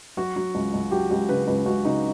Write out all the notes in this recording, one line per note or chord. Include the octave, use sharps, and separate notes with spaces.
F#3 F#4
F#3
C#2
C#2
F#3 G4
C#2 G4
C#3 B4
C#2 B4
C#2 F#4
C#3 D#4